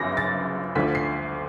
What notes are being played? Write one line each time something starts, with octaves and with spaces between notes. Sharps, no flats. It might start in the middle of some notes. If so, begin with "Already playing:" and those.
Already playing: G1 F#2 C#3 F3 A#6
A6
D2 D3 F3 B6
C7